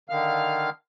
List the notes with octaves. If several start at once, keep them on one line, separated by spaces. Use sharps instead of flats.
D3 D#3 F5 F6